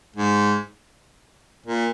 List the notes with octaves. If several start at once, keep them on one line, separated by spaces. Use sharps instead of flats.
G#2
A#2